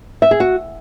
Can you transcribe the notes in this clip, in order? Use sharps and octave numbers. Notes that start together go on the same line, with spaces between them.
E5
G#4
F#4